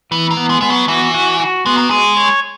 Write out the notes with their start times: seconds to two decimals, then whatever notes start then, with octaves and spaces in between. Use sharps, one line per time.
0.11 E3 B3
0.31 A#3
0.37 B3
0.50 G#3
0.61 G#3 B3
0.70 F#3
0.88 E3 F#4
1.14 F#4
1.40 F#4
1.66 G#3 B3
1.77 A#3
1.90 G#3 G#4
2.17 C#5